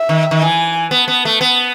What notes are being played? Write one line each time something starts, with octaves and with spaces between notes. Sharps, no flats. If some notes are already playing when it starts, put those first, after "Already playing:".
Already playing: E5
D#3
D#3
E3 G#5
B3 A5
B3
A3
B3